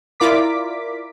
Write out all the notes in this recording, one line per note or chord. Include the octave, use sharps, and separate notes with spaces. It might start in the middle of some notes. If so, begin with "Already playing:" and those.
E4 F4 A#4 D5 D6 B6